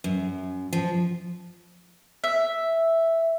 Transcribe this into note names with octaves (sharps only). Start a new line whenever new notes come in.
F#2
F3
E5